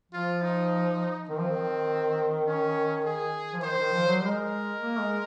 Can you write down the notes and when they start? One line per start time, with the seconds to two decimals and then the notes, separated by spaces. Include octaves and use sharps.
0.12 F3 F4
0.42 D#4
1.29 D#3 C4
1.39 F3
1.49 D#3
2.46 C#4
3.04 G#4
3.53 F3
3.62 D#3 C5
3.77 D#3
3.93 F3
4.07 F#3
4.21 G#3 A#4
4.80 A#3
5.00 G#3